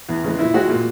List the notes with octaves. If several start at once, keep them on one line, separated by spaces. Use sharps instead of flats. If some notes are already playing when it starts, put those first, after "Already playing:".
E2
C#3 E3 G#3
A#2 E4
G#3 F#4
A#2